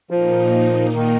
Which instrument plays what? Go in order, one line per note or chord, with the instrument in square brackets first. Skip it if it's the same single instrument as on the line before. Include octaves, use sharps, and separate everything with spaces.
[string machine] A#2 A#3 D#4 [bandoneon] F3
[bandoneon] D#3